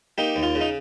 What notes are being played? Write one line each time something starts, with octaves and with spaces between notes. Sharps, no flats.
A#3 D#4 G4
D#2
F4
C#3
D#4